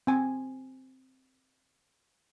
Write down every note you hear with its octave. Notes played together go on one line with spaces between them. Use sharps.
C4 G#5